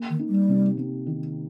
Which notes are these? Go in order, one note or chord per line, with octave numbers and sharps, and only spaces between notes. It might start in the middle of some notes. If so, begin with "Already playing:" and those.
Already playing: A#3
D#3
D#4
G3
C3
C3
D#3